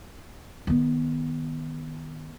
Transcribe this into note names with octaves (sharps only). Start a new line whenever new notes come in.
D#3 B3